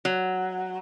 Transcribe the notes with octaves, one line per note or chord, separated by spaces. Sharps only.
F#3